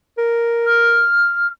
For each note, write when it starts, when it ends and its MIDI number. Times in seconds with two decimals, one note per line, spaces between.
0.18 1.04 70
0.66 1.47 89